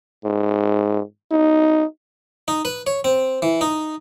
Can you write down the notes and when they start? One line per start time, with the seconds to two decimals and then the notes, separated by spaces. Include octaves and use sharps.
0.25 G#2
1.32 D#4
2.48 D#4
2.65 B4
2.87 C#5
3.04 C4
3.42 E3
3.61 D#4